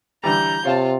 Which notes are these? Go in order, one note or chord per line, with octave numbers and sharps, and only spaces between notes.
D3 E3 G3 A#5 G6
C3 F4 C#5 F5 A5